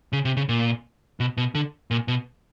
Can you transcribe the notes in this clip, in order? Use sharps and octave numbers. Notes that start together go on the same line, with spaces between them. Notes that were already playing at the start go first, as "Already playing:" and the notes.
C#3
C3
C#3
A#2
B2
B2
D3
A#2
B2